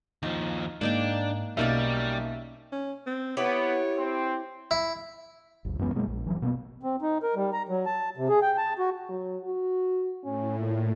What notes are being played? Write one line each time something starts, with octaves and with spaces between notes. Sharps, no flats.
D#2 F3 D#4
G#2 A#3 D4 D#4 G5
B1 G3 A#3 C#4 D#4 D5 E5
C#4
C4
B3 E4 G4 B4 C#5
C4
E4
G1 D2
F#2 E3 G#3 B3
B2 F#3 G#3 A#3
A#1
F1 E3 F#3
B2 A#3 B3
C4
D#4
A#4
G3
A#5
F#3
A5
C3
G#4
G5
A5
F#4
F#3
F#4
A2 C#4
A#2